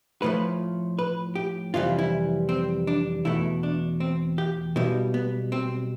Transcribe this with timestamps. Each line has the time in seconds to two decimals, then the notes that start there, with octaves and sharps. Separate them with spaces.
0.22 A2 F3 A3 B4
0.99 B4
1.35 G4
1.74 F2 C3 E3 G3 F4
1.98 E4
2.49 C4
2.87 D4
3.25 E2 B2 A3 E4
3.63 D4
4.00 C4
4.38 G4
4.76 B1 B2 G3 E4
5.14 B3
5.52 C4